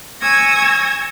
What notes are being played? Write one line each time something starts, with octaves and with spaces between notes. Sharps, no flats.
G#5 C#6 E6 G#6 A#6